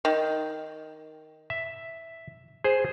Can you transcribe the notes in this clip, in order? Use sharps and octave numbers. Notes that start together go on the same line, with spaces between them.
D#3
E5
G#4 C5